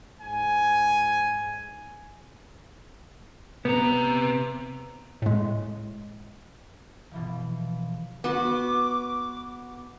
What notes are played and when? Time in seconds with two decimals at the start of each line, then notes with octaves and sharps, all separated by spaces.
0.21 G#2 G#5
3.65 C3 B3 A#5
5.22 A2 G#3
7.11 B2 E3 F3
8.24 B3 F#4 D6